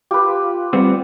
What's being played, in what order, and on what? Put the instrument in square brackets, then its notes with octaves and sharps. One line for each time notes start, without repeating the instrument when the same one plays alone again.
[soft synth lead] F4 [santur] G4 B4
[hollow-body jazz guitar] G3 B3 C4